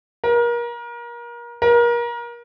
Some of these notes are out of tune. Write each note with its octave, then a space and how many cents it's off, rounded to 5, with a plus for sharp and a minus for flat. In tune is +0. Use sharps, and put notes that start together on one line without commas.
A#4 +30
A#4 +30